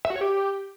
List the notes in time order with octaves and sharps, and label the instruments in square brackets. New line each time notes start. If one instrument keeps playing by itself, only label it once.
[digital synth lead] E5
F#4
C#5
G4